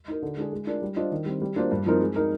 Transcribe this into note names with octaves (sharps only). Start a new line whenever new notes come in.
D#4 A#4
D3
G#3 D4 G#4
G#3
D4 F4 A#4 D5
G3
D4 F4 C5 D#5
D#3
G3 C4
G3
A#3 D4 F4 C5
G2
F3 C4 D#4 A#4
G#3
D#4 A#4